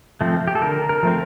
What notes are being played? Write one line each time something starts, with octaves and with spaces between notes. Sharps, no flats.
F3 A3 C4
G4
A4
D3 A#4
A#4
F3 A3 C4